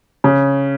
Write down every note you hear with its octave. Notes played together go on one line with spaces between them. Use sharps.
C#3